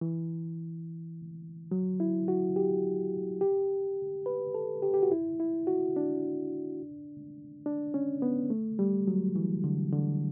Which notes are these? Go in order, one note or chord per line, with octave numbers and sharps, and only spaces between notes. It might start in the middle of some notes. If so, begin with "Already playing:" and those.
E3
F#3
E4
F#4
G4
G4
B4
A4
G4
G4
F#4
E4
E4
F#4
D4
D4
C#4
B3
A3
G3
F#3
E3
D3
D3